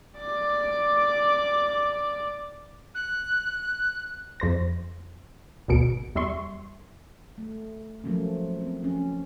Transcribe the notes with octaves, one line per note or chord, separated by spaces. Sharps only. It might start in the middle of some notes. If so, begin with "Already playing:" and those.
D5 D6
F#6
F2 C5 A#6
G#1 D2 B2 C#7 D7
E2 G3 E5 C6 C#6
A3
F3 F#3 A3 A#3 C#4
C4
F3 C#4